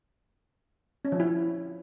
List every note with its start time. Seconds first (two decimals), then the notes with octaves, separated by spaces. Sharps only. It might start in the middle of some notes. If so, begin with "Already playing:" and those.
1.05 C#4
1.12 F3
1.20 E4